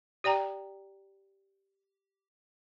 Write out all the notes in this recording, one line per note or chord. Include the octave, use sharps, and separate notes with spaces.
G4 D5 G5 A#5